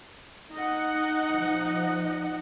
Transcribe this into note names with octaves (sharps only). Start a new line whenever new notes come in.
D#4 D#5 F#5
F3